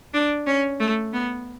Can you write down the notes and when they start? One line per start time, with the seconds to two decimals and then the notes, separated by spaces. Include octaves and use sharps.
0.14 D4
0.47 C#4
0.80 A3
1.13 B3